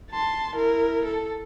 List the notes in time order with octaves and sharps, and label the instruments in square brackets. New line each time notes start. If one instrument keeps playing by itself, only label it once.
[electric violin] A5 C6
E4 A#4
A4